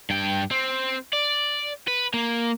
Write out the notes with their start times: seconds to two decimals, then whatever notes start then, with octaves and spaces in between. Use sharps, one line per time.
0.10 G2 G5
0.51 C4
1.13 D5
1.88 B4
2.14 A#3